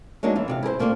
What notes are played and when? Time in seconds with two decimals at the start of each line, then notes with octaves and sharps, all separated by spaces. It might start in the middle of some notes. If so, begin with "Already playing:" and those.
0.23 F#3 G#3 A#3 D4 D#4
0.35 E3 F4 E5
0.48 C3 D5 F5
0.63 E4 G#4 A#4 C5
0.79 A3 A#3 C4 D4 F4